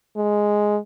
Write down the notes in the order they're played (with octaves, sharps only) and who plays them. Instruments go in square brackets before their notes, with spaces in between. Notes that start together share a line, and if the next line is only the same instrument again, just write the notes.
[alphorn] G#3